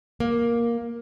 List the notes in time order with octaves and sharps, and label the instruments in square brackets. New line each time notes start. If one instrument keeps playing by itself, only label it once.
[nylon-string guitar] A#3